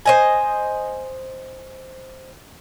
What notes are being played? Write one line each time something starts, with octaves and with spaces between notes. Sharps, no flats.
C5 D#5 G#5